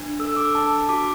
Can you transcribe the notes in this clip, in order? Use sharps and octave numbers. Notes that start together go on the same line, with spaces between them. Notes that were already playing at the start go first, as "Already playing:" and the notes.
Already playing: D4
A4 E6
E6
D6
D4 A5
F#4 D6